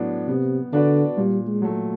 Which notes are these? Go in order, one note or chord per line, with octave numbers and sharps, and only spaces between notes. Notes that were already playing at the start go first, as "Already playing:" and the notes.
Already playing: A2 F#3 B3 D4
C3 B3
D3 D4 F#4 B4 D5
A#2 G3
G#3
F#3 A3